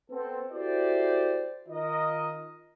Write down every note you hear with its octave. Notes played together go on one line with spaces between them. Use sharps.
B3 C4 A4
E4 F#4 G4 A4 C5 D5
D#3 F4 A#4 D#5